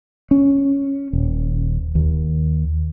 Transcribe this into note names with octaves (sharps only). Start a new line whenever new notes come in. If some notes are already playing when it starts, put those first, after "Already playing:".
C#4
D#1
D#2